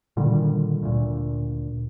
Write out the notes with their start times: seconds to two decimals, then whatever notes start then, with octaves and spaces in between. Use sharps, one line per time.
0.17 A#2 D3 D#3 G3
0.83 D2 A#2